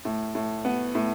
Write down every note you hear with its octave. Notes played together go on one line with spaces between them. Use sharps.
A2
A2
B3
A2